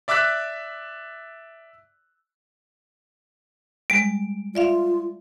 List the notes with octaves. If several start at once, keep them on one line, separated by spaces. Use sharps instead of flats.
D5 E5 D6 E6 F#6 B6
G3 G#3 D7
F4 D5 E5 F5